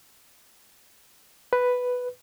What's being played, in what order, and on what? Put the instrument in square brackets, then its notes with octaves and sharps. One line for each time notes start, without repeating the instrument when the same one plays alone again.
[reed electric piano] B4